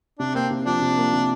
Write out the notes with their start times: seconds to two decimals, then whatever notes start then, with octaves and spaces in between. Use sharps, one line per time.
0.19 C3 D4
0.35 A#3 C4
0.51 C3
0.66 F3 D4
0.82 C3
0.97 A#3
1.13 C3